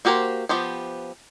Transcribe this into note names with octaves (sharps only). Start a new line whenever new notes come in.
A#3 F#4 G4 A#4 C5
F3 B3 G4 C5